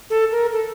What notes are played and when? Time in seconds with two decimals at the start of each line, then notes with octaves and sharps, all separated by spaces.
0.10 A4
0.32 A#4
0.53 A4